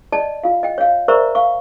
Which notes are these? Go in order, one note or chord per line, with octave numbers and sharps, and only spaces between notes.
D5 D#5 A5
F4 F5
D#5 G5
C#5 F5
A#4 C5 D5 E5 A#5 C#6
F5 C#6